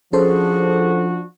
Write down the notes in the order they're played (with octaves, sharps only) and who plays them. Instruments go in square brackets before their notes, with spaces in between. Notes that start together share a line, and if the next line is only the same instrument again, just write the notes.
[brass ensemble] F3 D4 F#4 [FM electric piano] C#4 A4 C5 [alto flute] G#4